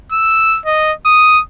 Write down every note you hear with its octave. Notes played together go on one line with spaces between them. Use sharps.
E6
D#5
D#6